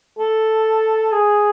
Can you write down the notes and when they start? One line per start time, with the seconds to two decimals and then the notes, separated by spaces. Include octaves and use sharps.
0.19 A4
1.12 G#4